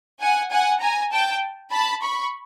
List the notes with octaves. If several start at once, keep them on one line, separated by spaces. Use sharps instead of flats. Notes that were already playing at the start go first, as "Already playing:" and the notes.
F#5 G#5
F#5 G#5
G#5 A#5
G5 A5
A5 B5
B5 C#6